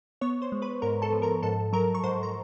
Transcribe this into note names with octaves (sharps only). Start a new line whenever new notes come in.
B3 C#5 C#6
C5 C6
G#3
B4 B5
G#2 A#4 A#5
A4 A5
F3
A#4 A#5
G#2 A4 A5
F#3 A#4 A#5
C#6
G#2 C5 C6
A#5